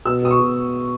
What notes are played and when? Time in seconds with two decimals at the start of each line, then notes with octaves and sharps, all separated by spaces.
0.05 B2 E6
0.22 B2 D#6
0.31 C#6
0.40 B2